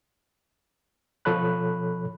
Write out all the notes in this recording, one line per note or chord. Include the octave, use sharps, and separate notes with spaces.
B2 F3 A4 C#5 B5 F#6